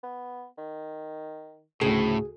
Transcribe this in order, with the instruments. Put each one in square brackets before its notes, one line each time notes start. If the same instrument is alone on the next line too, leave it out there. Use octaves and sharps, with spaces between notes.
[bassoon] B3
D#3
[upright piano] D2 C#3 [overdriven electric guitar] A2 [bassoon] C4 [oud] G#4